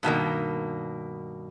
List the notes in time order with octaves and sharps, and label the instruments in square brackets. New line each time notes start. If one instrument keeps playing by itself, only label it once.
[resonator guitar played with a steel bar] G2 B2 D#3 A#3